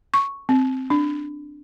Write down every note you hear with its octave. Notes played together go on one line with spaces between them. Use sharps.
C#6
C4
D4